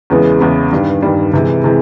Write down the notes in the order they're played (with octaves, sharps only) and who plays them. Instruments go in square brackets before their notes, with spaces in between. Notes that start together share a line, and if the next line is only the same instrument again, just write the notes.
[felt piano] E2 C#3 E3 G#3 B3
E2 C#3 E3 G#3 B3
G2 D#3 G3
G2 D#3 G3
C3 E3 G#3
C3 E3 G#3